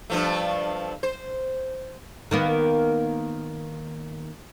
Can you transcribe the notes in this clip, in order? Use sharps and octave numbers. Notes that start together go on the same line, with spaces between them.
G2 F3 A3
C5
D#3 A#3 B3